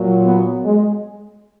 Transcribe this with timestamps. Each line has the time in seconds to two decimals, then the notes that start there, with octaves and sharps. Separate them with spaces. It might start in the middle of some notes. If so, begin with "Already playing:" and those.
Already playing: A#2 F#3
0.26 B3
0.64 G#3